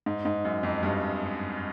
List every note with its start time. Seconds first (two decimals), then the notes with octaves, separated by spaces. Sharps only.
0.06 G#2
0.25 G#2
0.45 F#2
0.63 F2
0.83 G2